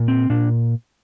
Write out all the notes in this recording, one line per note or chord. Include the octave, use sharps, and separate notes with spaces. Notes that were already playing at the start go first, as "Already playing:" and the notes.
Already playing: A#2
C4
A#2 D4